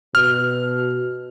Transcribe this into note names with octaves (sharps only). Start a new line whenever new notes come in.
B2 F6